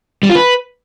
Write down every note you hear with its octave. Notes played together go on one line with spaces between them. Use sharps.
G3
F4
B4